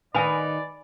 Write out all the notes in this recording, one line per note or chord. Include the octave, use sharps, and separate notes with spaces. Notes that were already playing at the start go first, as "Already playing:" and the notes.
D#3 D#4 B4 D5 D#5 F5 G#5 B5